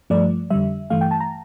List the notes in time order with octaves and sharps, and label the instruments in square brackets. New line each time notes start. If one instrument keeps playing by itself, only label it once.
[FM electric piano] G2 F3 A3 D5
F2 D3 G3 E5
G2 E3 A3 F5
G5
A5
A#5